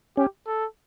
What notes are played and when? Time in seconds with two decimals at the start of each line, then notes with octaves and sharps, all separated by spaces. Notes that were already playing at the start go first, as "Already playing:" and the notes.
0.17 C#4 G4
0.47 A4